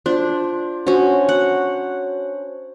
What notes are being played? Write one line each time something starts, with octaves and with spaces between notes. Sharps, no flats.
D4 F4 C5
C#4 D4 F#4 C5 C#5
F#5